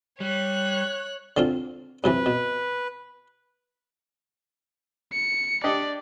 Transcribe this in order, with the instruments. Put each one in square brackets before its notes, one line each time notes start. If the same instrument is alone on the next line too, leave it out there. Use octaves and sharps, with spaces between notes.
[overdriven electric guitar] G3 [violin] C#5 F#6
[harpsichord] D3 C4 F4
[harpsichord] F#2 C3 E3 [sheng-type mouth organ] B4
[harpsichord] B2
[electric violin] C#7
[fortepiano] D4 G4 D#5 [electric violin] D5